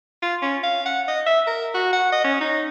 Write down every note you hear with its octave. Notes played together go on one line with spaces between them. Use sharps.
F4
C#4
F5
F#5
D#5
E5
A#4
F#4
F#5
D#5
C#4
D#4